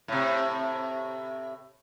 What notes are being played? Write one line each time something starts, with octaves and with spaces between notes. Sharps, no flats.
A2 C3